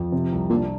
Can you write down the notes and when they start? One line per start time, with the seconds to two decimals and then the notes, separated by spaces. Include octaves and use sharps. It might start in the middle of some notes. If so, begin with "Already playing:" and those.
Already playing: F2
0.12 C3
0.32 C2
0.50 A#2 D4